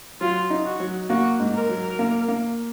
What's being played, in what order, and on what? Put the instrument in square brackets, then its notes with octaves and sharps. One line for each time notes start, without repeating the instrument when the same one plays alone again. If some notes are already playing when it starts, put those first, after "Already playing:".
[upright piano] F#3 [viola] F4
[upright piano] D#4
[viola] F#4
[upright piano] F#3
[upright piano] A#3 [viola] F#4
[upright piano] G#2
[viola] A#4
[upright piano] F#3
A#3
A#3